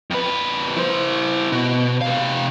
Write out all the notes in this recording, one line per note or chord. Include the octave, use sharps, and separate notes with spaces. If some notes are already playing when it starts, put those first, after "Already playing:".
F2 B4
E4 C5
B2
C3 F5